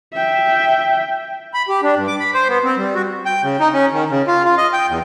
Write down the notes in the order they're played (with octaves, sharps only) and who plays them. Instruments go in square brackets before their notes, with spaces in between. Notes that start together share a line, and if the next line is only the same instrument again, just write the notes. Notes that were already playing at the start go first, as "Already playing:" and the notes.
[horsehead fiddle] E5 G5
[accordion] B5
G4
D4
G2
D6
B5
C5
B3
C4
G3
F#4
G5
C#3
D#4
C#4
D#3
C#3
F4
F4
D#5
G5
E2